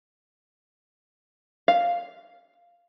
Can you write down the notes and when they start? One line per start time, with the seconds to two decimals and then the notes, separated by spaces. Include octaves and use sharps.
1.68 F5